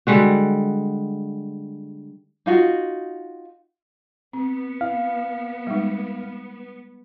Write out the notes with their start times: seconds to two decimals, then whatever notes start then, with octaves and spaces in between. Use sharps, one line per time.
0.07 D3 G3 G#3 F#4
2.46 D#4 F4 F#4
4.33 B3 C4
4.81 E4 F5
5.67 G3 G#3 D#4